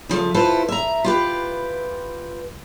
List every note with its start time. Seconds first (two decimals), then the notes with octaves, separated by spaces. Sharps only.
0.09 C#3 F3 A3
0.34 E4 F4 A4 B4 C5
0.69 E5 A#5
1.04 F4 G4 B4